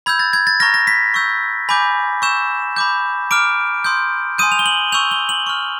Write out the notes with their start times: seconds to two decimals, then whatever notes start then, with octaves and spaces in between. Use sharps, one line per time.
0.06 B5 E6 G6 G#6
0.19 A6
0.33 G#6
0.47 A6
0.60 A#5 C#6 F6 A#6
0.74 A#6
0.87 B6
1.14 C#6 E6 G6
1.69 G#5 B5 D6 G6
2.22 C#6 E6 G6 E7
2.76 B5 D6 G6
3.31 A#5 D6 F6 D7
3.84 C6 D#6 G6
4.38 G#5 C6 D#6 G6 D#7
4.52 F7
4.59 G7
4.66 F#7
4.92 C#6 E6 G6 F7
5.11 G7
5.29 F#7
5.46 C#6 F6